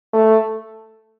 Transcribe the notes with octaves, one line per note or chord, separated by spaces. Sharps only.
A3